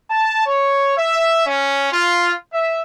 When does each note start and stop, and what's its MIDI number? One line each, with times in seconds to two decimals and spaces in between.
0.11 0.44 81
0.47 0.93 73
0.97 1.43 76
1.47 1.92 61
1.93 2.34 65
2.52 2.82 76